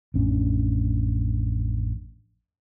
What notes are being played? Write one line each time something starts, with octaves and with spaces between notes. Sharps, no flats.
A1 F2 C#4 D4